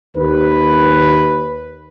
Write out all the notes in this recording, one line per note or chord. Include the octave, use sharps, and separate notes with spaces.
D#2 B4